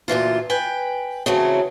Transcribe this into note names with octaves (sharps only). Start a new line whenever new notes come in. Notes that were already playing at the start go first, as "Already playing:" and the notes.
D2 A#2 E3 F4
B4 G5 G#5
C#3 E3 F#3 A3 C4